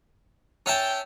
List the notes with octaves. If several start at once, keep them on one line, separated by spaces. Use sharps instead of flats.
C#4 E5 G5 A5